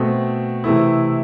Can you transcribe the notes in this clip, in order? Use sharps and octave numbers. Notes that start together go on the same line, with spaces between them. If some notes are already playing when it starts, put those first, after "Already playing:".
Already playing: B2 A3 C4
C3 E3 A3 E4